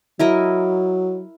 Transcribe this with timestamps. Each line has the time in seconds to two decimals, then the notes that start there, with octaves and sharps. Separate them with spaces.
0.19 F#3 E4 A#4 D#5